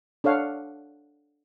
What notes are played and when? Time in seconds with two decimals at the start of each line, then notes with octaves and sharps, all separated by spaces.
0.24 D4 A4 C#5 F5 F#5